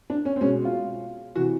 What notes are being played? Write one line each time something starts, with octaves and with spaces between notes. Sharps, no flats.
D4
C#4
C4
B2 G#3 C#4
F4
C3 E3 F#4